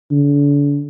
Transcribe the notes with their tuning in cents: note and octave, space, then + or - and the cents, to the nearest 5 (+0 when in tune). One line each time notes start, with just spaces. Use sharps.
D3 -40